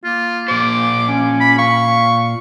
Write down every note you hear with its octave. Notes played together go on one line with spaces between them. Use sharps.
A#3 F4
A#2 C5 D6
C#4
B5
F5 C#6